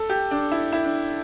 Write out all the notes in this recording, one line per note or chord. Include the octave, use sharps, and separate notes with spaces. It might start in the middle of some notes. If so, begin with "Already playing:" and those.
Already playing: A4
G4
D4
E4
E4
D4